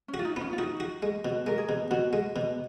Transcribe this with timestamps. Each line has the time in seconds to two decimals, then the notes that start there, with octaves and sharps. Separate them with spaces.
0.08 C#4
0.14 F#4
0.19 F4
0.25 D#4
0.36 B3 C#4
0.53 F4
0.58 D#4 F#4
0.80 F#4
1.02 G#3
1.25 B2 F#4
1.47 G#3 A#4
1.58 G#4
1.69 B2
1.91 B2 F#4
2.13 G#3
2.36 B2